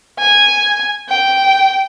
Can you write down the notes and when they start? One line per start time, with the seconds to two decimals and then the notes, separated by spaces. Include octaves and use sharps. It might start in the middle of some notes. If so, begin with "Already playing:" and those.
0.19 G#5
1.08 G5